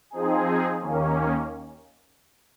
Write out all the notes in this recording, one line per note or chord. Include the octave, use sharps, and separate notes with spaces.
F3 C4 D#4 G#4
D#2 D#3 A#3 C#4